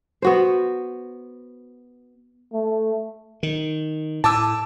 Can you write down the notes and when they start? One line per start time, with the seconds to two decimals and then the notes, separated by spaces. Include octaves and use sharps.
0.22 B3 F#4 C5
2.53 A3
3.43 D#3
4.24 A2 A5 D6 E6